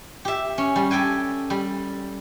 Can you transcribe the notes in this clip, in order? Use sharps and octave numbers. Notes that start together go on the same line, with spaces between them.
G4 E5
C#4
G3
G4 A4 G5 G#5
G3